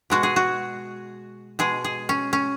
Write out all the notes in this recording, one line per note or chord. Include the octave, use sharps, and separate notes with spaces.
B2 G#3 F#4
G#4
F#4
B2 G#3 G#4
G#4
C#4
C#4